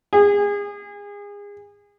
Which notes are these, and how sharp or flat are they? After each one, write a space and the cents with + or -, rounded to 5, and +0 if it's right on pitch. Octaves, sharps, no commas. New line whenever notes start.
G#4 -30